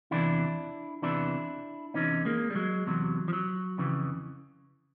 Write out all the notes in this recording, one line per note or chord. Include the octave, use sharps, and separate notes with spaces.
E2 C3 E3 D4 E4
E2 C3 E3 D4 E4
E2 C3 E3 C#4 D#4
G#3 A#3
G3
F#3 G#3
E2 C3 E3 F#3
F3
F#3
F2 C#3 E3